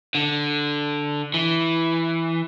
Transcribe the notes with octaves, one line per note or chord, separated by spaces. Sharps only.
D3
E3